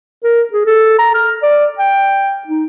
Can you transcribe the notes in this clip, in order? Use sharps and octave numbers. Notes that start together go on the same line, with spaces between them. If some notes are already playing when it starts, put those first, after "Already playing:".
A#4
G#4
A4
A#5
F6
D5
G5
D#4